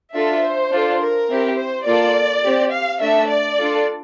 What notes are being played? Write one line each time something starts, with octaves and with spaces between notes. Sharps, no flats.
D4 F4 A4 E5
C5
D4 F4 A4
A#4
C4 E4 G4
C5
A#3 F4 A4 D5
C4 G4
F5
A3 D4 A4 E5
D5
D4 F4 A4